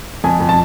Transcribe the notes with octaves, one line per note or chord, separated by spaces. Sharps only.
F2 G#5
F2
A5